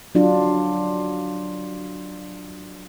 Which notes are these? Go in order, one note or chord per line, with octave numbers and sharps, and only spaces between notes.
F#3 D4 F4